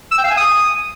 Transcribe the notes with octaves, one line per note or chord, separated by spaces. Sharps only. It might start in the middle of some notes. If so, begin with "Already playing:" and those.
E6
G5
F5
G#5
D#6